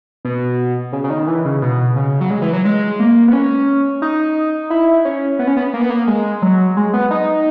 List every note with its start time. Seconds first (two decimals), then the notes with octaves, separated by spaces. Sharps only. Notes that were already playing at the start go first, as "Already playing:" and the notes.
0.25 B2
0.93 C#3
1.04 C#3
1.10 D#3
1.27 E3
1.45 C#3
1.62 B2
1.96 C#3
2.21 F#3
2.30 G#3
2.42 E3
2.53 F#3
2.65 G#3
3.00 A#3
3.28 B3
3.33 C#4
4.02 D#4
4.70 E4
5.05 C#4
5.39 B3
5.47 C#4
5.56 B3
5.74 A#3
5.82 B3
5.90 A#3
6.07 G#3
6.42 F#3
6.77 G#3
6.94 B3
7.11 D#4